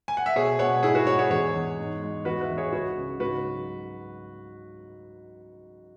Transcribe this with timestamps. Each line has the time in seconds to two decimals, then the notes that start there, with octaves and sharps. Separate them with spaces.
0.08 G#5
0.17 F#5
0.26 E5
0.36 B2 G#4 C#5
0.59 B2 C#5 F#5
0.83 G#2 E4 G#4
0.95 F#4 B4
1.07 G#2 C#5 F#5
1.19 G#4 C#5
1.30 E2 G#4 C#5
1.55 E2
1.79 G#2
2.03 G#3
2.25 E2 F#4 B4
2.41 B4 E5
2.49 E2
2.57 G#4 C#5
2.73 C#2 F#4 B4
2.98 C#3
3.20 G#2 F#4 B4
3.44 F#3